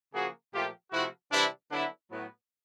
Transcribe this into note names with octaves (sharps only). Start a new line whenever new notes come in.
C#3 F3 A#3 F#4 G#4
A#2 F3 A3 F4 G4
C3 F3 A3 E4 F#4
C3 E3 G3 D4 E4
D3 F#3 B3 D4 E4
A2 F#3 B3